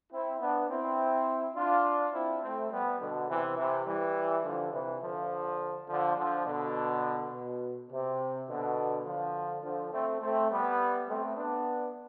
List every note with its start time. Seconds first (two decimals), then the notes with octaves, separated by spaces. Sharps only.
0.11 C4 E4
0.40 B3 D4
0.69 C4 E4
1.55 D4 F4
2.13 C4 E4
2.42 A3 C4
2.71 G3 B3
3.00 B2 D3
3.29 C3 E3
3.57 C3 E3
3.86 E3 G3
4.44 D3 F3
4.73 C3 E3
5.02 D3 F3
5.88 D3 F3
6.17 D3 F3
6.46 B2 D3
7.32 B2
7.90 C3
8.47 B2 D3
9.05 D3 F3
9.63 D3 F3
9.92 A3 C4
10.21 A3 C4
10.50 G3 B3
11.07 A3 C4
11.36 B3 D4